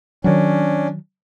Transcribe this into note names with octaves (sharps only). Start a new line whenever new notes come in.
D#3 F#3 C#4 D4